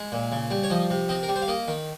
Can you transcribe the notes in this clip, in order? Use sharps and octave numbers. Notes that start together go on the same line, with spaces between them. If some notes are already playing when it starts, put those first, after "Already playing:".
Already playing: G#3
A#2
C#3
G3
C#5
F3 D#5
C3
C4 D#5
A#4
G3
C5
F5
A#3 D#5
D#3